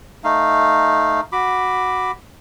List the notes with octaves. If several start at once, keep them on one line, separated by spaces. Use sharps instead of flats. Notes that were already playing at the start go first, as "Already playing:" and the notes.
A3 D#4 F5
F#4 B5 D6